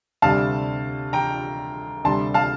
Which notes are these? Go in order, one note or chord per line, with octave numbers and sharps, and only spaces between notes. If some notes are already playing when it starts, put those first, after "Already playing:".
D2 C3 G3 F5 A5
G5 A#5
D2 C3 G3 A5 C6
F5 A5